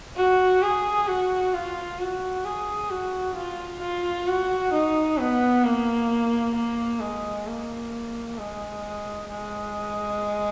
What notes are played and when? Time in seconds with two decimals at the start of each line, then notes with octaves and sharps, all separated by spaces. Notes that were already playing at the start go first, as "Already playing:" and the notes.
0.16 F#4
0.62 G#4
1.07 F#4
1.53 F4
1.99 F#4
2.45 G#4
2.90 F#4
3.35 F4
3.81 F4
4.27 F#4
4.73 D#4
5.18 B3
5.64 A#3
6.56 A#3
7.01 G#3
7.47 A#3
8.38 G#3
9.29 G#3